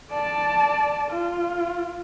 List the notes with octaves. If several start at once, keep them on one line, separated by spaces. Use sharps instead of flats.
D5 A5
F4